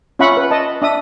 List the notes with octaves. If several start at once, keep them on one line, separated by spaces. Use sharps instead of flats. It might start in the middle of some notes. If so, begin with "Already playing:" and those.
C#4 F4 E5 F#5 B5 C#6
B4
D#5 A5
D4 E5 D#6